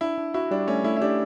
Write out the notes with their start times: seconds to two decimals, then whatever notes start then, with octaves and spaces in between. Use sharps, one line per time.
0.01 D4 E4
0.18 D4
0.34 E4 F#4
0.51 G3 D4
0.68 A3 C#4
0.84 A3 E4
0.97 E4
1.01 D4 G4